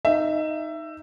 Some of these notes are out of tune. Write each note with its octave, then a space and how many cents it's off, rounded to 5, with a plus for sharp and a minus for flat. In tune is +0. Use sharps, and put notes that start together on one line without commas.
D#4 +0 E5 +15